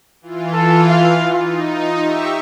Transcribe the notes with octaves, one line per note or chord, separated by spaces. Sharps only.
E3 F4
A4
F5
D#4 F4
G4 E5 C#6